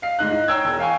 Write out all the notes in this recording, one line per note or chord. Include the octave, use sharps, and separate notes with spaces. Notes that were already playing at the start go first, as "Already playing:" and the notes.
F5 C7
G#2 D#4 F#6
D#4
C#5 G5 A#5 E6 G#6
E1
F5 G5 G#5 C#6